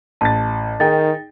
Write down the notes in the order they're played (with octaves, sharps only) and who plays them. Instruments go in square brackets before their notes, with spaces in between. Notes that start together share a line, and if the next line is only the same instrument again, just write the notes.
[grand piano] A1 A6 [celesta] A5
[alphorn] D#3 [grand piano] D#4 G#4 G5 [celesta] A6